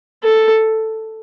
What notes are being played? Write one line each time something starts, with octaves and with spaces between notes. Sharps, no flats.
A4